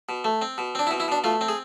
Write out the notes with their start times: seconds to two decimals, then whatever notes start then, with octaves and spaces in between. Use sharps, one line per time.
0.09 B2
0.24 A3
0.42 C4
0.58 B2
0.75 C4 D4
0.87 E4
0.91 B2
1.00 E4
1.08 B2 D4
1.24 A3 F4
1.41 C4
1.48 G#4